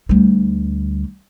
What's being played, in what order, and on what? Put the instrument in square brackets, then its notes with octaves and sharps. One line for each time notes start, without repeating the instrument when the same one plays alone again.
[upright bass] D2 G3